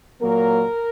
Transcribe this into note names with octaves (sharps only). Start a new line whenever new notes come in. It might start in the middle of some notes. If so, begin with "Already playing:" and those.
A#2 F#3 A#3 A#4